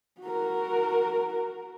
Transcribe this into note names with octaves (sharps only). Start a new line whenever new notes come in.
F#4 A#4